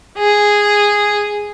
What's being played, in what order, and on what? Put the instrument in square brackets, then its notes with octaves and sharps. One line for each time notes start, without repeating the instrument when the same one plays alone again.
[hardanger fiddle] G#4